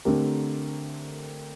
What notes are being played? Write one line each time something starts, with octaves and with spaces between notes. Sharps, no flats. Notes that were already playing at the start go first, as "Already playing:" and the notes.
D3 A3 C4 G4 A#4